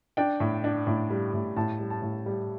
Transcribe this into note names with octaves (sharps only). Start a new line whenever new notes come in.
D4 G5
A2
D4
A2
G3
A2
A2 A5
G3
A5
A2
G3